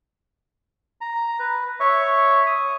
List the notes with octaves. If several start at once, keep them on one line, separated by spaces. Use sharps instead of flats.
A#5
B4
C#5 E5 C#6
D#6